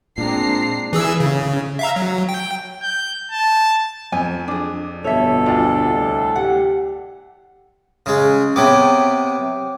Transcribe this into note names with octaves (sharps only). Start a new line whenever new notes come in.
A#2 G#3 C4 D4 A#5 C7
E3 G#4 E6
C#3
E5 F5 A#5
F#3
G5
G6
A5
F2 G#5
D4 G#4
G1 B2 A4 C#5 E5
D2 F4 D5
C2 A2
G4 F#5
C#3 G#3
C3 B3 C#5 G5 D6